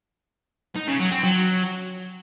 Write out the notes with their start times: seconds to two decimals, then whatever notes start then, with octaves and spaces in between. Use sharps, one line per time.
0.76 D#4
0.88 C#3
1.00 F#3
1.12 C4
1.23 F#3